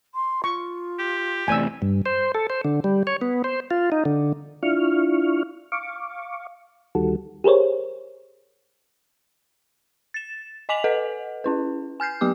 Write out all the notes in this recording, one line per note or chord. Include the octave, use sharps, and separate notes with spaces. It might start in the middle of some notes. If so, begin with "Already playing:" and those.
C6
F4 C#6
G4
A1 A2 C3 D5 G#5 E6
G2
C5
A4
C5
D3
G3
C#5
B3
C5
F4
D#4
D3
D4 E4 F4 C#6 F6
F5 C#6 D6
D2 D#3 G3 F#4 A4
G4 G#4 A#4 C5 C#5
A6 E7
D#5 G#5 D6 B6 F7 F#7
A4 B4 D#5 F#5
C#4 E4 B4
G#5 F6 G6 C7
F#3 B3 G4 D6